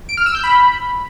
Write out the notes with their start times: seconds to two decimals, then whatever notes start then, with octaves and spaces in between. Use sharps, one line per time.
0.09 D7
0.17 F6
0.26 E6
0.35 G6
0.44 B5